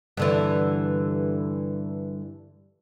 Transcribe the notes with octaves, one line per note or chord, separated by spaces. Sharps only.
G2 D3 E3